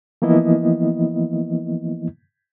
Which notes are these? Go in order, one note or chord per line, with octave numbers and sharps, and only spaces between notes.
E3 F3 A#3 B3 E4 D#5